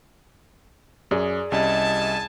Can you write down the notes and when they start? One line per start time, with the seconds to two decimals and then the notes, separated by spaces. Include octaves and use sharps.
1.11 F#2 G#4 D5
1.52 C2 G3 C#4 D#5 G#5 A5